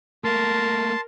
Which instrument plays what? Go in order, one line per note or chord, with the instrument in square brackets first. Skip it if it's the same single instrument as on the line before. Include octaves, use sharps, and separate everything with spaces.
[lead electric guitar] A3 A#3 [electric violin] A#4 [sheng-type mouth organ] A5 C6